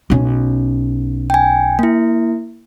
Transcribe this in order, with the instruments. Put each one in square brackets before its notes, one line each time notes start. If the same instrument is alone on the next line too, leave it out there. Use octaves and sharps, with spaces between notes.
[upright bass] B1 C#4
[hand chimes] G5 G#5
A#3 E4